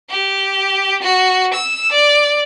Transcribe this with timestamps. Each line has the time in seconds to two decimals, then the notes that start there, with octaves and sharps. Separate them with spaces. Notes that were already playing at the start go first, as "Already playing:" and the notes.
0.10 G4
1.02 F#4
1.53 E6
1.92 D5